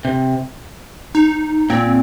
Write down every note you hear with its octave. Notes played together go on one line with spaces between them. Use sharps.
C3
D#4
A#2 C4